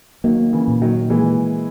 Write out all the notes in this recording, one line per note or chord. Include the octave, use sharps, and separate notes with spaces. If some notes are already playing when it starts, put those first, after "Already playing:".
D#3 F#3 A#3
C#3 E3
A#2
D#3 F#3
E3 G#3 A#3